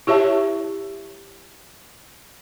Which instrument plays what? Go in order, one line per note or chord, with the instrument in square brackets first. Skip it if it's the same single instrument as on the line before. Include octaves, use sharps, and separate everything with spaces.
[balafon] E4 G4 C#5 E5 A5